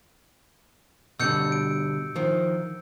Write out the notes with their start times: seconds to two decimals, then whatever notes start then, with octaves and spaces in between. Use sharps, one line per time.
1.19 B2 D3 G3 E6 G6 C#7
1.52 D7
2.16 D#3 F3